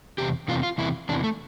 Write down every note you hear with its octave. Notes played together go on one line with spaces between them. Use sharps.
E2 C3 G4
E2 C3 E3 F4
F4
E2 C3 E3 E4
E2 C3 E3 D4
A3